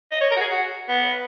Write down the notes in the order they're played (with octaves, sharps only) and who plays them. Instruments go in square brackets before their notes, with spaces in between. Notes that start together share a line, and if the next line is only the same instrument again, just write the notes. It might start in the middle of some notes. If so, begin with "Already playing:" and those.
[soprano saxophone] D#5
C#5
A#4
F#4
G#4
F#4
B3